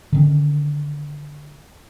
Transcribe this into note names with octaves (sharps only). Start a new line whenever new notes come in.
D3 D#3 C#4